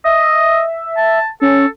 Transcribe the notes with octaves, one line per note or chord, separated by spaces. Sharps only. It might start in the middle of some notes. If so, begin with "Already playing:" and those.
D#5 E5
A5
C#4 A4